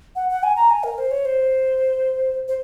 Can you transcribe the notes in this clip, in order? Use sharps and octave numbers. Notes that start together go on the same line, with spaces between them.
F#5
F#5
G#5
A#5
G#5
A#4
C5
C#5
C5
C5